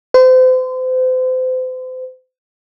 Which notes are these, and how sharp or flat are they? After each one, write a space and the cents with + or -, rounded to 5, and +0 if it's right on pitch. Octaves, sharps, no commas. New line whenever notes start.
C5 -35